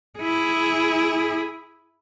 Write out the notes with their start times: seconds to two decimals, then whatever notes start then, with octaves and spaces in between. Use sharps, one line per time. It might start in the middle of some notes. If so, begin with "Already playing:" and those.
0.19 E4 G#4